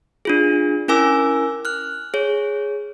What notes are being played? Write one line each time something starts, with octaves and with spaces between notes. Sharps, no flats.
D4 F4 G#4
C#4 E4 A#4 G#5 D6 E6
F6 F#6
G#4 C#5